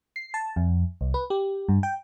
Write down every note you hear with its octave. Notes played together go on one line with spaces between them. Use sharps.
C7
A5
F2
C2
B4
G4
G2
G5